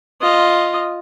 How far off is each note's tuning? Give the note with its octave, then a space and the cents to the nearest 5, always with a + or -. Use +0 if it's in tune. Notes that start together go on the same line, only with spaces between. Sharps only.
F4 +0 D#5 +0